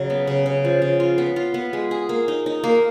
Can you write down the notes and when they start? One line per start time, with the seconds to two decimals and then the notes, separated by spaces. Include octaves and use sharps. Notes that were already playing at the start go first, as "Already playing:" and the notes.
Already playing: C#3 F#3
0.10 B3
0.27 C#3
0.46 C#3
0.65 F3
0.82 C#3
1.00 F4
1.18 B3
1.36 F4
1.54 B3
1.73 G#3
1.91 G#4
2.09 A#3
2.28 D#4
2.46 D#4
2.64 A#3